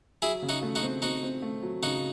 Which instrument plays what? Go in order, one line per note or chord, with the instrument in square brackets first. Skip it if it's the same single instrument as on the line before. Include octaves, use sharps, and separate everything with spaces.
[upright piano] F#3 [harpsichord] E4 G#4
[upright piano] C#3
[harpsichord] D#4 F#4
[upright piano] A3
[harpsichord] D#4 F#4
[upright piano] C4
[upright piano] C4 [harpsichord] D#4 F#4
[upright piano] C4
A3
F#3
[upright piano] C#3 [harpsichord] D#4 F#4